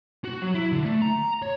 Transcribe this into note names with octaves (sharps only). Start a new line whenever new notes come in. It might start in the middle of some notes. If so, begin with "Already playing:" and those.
F#4
F#3
E4
D3
A3
A#5
C#5